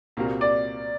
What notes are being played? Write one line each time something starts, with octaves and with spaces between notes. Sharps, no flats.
C2 A#2 G3 A#3 F#4
D5